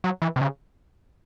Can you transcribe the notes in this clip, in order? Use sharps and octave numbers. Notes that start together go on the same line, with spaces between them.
F#3
E3
C3
C#3